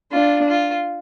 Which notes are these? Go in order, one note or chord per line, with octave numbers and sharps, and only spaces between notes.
D4 F4
F4